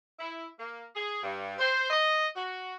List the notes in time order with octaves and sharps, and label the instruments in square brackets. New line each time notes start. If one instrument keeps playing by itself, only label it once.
[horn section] E4
A#3
G#4
G2
C5
D#5
F#4